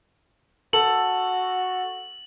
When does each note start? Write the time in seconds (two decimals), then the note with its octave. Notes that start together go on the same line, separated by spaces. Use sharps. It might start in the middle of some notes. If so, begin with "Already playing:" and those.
0.73 F#4 A4 F#7